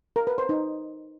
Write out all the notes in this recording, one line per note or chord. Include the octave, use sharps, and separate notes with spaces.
A#4
B4
C5
D#4